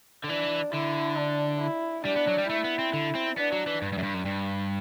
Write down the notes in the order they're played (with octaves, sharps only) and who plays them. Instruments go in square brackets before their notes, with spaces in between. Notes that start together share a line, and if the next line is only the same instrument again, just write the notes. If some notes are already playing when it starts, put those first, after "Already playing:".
[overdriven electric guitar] D3
[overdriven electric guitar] E3 [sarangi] D4
[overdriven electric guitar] D3 [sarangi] E4
[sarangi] D4
E4
[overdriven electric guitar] G3 [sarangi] D4
[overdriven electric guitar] B3
F#3
G3
[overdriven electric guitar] A3 [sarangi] E4
[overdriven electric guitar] B3
C4
D3
C4
[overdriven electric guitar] B3 [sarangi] D4
[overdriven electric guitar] F#3
E3
G2
G2
F#2
G2
F#2
G2